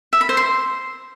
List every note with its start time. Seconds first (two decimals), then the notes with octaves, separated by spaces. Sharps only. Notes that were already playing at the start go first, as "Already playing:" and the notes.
0.13 E5
0.21 B5
0.29 C5
0.37 C6